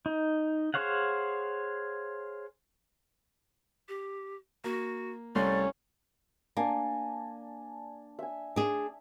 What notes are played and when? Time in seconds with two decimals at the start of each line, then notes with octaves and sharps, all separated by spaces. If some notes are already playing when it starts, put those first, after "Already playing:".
0.06 D#4
0.74 G#4 C5 C#5 F5 F#5
3.89 G4
4.64 A#3 F#4
5.36 C2 A3 C#4 D5 C6
6.57 A#3 D4 G#5
8.19 E5 G#5
8.56 D4 G#4